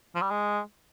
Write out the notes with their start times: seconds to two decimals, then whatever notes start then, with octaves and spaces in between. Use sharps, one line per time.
0.15 F3
0.22 G3
0.30 G#3